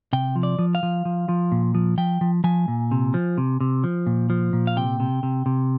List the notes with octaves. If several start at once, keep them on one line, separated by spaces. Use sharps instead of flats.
C3 G5
F3
D5
F3
F5
F3
F3
F3
A#2
F3
F3 G5
F3
F3 G#5
A#2
C3
F3
C3
C3
F3
A#2
F3
A#2
F5
C3 G5
C3
C3
C3